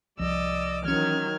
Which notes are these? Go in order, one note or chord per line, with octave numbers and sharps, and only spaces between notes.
C2 F3 D5 D#5 D6 E6
D#3 E3 F#3 C#4 F6 G#6